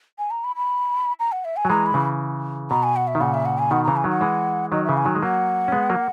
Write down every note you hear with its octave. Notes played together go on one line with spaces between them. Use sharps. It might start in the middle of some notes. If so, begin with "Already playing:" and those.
G#5
A#5
B5
B5
A#5
F#5
E5
G#5
F#3
E3 G#3 A#5
B5
C#3 E3
B2 A#5
G#5
F#5
E5
D#3
A#2 C#3 F#5
E5
F#5
G#5
B2 D#3 F#5
C#3 E3 A#5
G#5
D#3 F#3 F#5
E3 G#3
D#3 F#3 D#5
C#3 E3 E5
G#5
D#3 F#3
G#3
F#3 A#3 F#5
C#4
G#3 B3
F#3 A#3